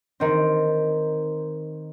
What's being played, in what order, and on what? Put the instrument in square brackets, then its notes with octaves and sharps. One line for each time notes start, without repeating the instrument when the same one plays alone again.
[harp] D#3 C4